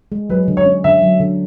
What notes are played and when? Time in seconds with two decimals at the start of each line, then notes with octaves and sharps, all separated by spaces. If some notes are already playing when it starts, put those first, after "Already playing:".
0.12 G#3
0.30 F#3 B4
0.48 D3
0.57 C#5
0.66 C#4
0.84 D3 E5
1.02 F#3
1.20 D3